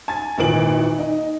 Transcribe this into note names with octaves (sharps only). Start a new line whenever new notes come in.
G#5 A6
G#1 A#2 D#3 E3 D7 F#7
D#4